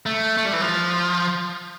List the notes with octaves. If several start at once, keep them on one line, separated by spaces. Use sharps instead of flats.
A3
A3
G3
E3
F3